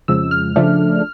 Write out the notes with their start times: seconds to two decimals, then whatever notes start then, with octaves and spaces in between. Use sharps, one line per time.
0.08 F2 C#3 F3 G#3 E6
0.31 F6
0.56 C#3 F3 A3 D4